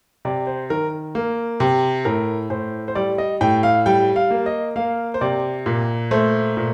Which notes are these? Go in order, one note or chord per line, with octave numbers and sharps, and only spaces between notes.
C3 D5
C5
D#3 A#4
A#3
C3
A2 A#4
A2 C5
C5
G3 D5
D#5
A2 G5
F5
G3 G5
F5
A#3
D#5
A#3 F5
C5
C3 D5
A#2
A3 C5
A#2